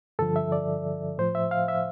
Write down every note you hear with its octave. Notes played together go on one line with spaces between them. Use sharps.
G2 D3 F3 A4
E5
D5
A2 F3 C5
E5
F5
E5